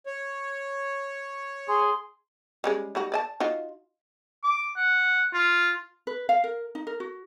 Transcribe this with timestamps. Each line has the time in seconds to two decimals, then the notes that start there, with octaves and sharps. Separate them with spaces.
0.06 C#5
1.68 G#4 C6
2.64 G3 G#3 C#4
2.95 G3 D#4 F#4
3.12 D5 D#5 A5
3.40 D#4 F4 F#4
4.44 D6
4.76 F#5
5.34 F4
6.07 B4
6.29 F5
6.44 A#4
6.75 D#4
6.87 A#4
7.00 F#4